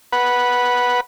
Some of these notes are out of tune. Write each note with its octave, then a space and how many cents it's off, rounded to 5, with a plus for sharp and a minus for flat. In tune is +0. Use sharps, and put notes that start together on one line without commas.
B4 -10 F#5 +0